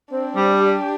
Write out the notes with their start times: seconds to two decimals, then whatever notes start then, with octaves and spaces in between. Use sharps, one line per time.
0.11 C4 D4
0.35 G3
0.60 G4